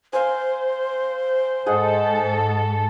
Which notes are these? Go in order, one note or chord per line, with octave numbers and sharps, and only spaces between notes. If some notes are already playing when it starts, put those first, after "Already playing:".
C5 F5 G#5
G#2 G#4 A4 D#5 F#5